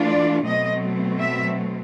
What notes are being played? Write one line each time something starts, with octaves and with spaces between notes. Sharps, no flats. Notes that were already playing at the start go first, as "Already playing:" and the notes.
Already playing: E3 A3 D4 F4
D5
B2 F#3 A3 C4 D#5
E5